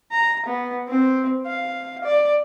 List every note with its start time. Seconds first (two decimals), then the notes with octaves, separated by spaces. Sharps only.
0.12 A#5
0.46 B3
0.88 C4
1.46 F5
2.04 D5